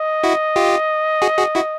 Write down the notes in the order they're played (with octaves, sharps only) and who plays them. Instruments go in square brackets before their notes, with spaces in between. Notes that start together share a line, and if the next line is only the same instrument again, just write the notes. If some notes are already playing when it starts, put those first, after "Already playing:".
Already playing: [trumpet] D#5
[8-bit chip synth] E4 F#4
F4 G4
F#4 G#4
F#4 G#4
E4 F#4